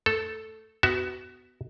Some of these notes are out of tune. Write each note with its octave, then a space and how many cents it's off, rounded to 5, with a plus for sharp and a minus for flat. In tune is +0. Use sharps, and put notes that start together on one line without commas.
A3 +0 A4 +0
B3 +20 F#4 +20 E5 +0